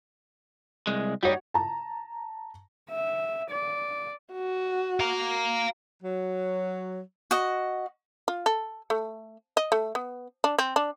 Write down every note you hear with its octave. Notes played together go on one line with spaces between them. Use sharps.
C2 G#3
G3 D#4 F#4 C#5
A5 A#5
E5
D5
F#4
F5 A#5
F#3
F#4 D#5
F4
A4
A3
D#5
A3
B3
D4
C4
D4